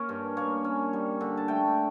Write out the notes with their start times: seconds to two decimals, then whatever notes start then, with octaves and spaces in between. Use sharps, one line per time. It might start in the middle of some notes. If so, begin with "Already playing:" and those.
Already playing: A#3 C#4 A#4 C#5
0.09 G2
0.37 A#3 C#5
0.64 C#4
0.93 G3
1.21 D3
1.37 A5
1.48 A3 G5